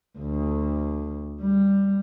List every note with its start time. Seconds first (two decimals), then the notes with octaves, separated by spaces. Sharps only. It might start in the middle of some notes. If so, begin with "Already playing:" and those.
0.18 D2
1.42 G3